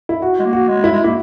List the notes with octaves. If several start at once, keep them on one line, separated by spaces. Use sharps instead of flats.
E4
F#4
G#3
A#3
F#4
G#3
E4
G#3
A#3 E4